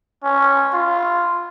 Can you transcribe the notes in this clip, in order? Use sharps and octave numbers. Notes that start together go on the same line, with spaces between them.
C#4
F4